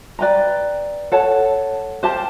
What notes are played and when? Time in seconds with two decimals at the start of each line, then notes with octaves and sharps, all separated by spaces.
0.19 B4 D5 G5 A#5
1.12 A4 C#5 F#5 A5
2.03 G4 C5 F5 A5